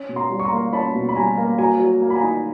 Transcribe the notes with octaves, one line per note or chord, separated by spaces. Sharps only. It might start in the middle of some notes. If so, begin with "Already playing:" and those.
Already playing: C#4
B2
A#5 C6
G3
C#6
A#5 C6
A#3
C#4 A5 B5
B2
B5
G3 G#5 A#5
A#3
F#3 G#5 A#5
F#3
A#3
B5
G#5 A#5
D#4